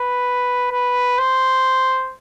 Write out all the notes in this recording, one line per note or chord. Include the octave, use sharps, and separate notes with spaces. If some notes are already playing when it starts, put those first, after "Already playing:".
Already playing: B4
B4
C5